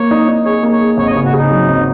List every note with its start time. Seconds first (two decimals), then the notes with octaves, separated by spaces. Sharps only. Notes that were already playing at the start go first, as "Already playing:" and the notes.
Already playing: A#3 C#5
0.11 D#4
0.29 D#4
0.45 G#4 C#5
0.63 A#3
0.72 C#5
0.81 G#4
0.98 G#1 C#5
1.07 D#5
1.11 C#5
1.16 C#3
1.25 F#4
1.33 C#3 D#4
1.51 F#3
1.68 G#1